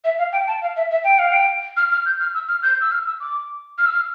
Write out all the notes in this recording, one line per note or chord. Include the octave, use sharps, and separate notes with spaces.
E5
F5
G5
A5
F5
E5
E5
G5
F5
G5
F6
F6
G6
F6
E6
F6
G6
E6
F6
E6
D6
F6
E6
F6